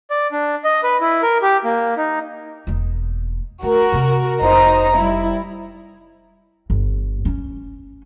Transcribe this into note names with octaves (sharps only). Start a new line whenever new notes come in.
D5
D4
D#5
B4
E4
A#4
G4
A#3
D#4
E1 A#3
A3 F#4 A#4
C3 C4
F1 D#4 C5 A#5
G3 E4
G1
C#4